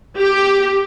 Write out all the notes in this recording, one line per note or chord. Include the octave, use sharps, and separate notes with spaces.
G4